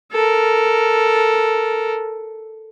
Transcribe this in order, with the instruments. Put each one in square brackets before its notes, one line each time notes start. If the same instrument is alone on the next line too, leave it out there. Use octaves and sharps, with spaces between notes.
[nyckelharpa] A4 A#4